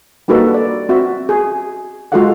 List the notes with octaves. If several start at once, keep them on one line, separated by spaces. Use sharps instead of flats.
G3 A#3 D#4 F#4 A4 B4
D5
C4 F#4 E5
G#4
G#3 F4 F#4 A4 F5 F#5